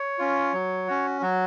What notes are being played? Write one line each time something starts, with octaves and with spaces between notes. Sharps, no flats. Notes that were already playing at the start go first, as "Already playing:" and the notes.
Already playing: C#5
C#4 F4
F#3
C#4 F#4
F#3 F#4